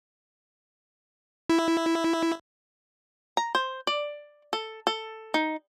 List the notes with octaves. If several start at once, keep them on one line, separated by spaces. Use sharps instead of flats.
E4
A#5
C5
D5
A4
A4
D#4